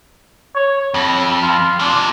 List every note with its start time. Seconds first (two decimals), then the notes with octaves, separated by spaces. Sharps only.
0.55 C#5
0.94 F2 B5
1.42 F4
1.79 C3 D4 F4